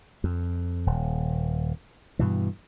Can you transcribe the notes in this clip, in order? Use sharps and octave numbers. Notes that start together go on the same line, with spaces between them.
F2
D#1
G2 B2 E3